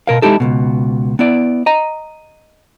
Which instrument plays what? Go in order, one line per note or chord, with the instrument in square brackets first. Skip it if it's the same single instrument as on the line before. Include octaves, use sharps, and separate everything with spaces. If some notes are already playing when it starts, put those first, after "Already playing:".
[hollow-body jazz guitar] B2 A#4 F5
G#3 D#4 E4 G4 A4
C#2 G2 B2
B3 E4 D5
D#5 A#5